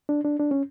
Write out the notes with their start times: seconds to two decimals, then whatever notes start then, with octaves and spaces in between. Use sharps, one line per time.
0.09 D4
0.25 D4
0.40 D4
0.51 C#4